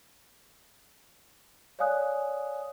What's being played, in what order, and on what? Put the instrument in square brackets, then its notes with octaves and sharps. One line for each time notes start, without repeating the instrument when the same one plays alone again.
[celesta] C#5 D5 F5 G#5 D#6 F#6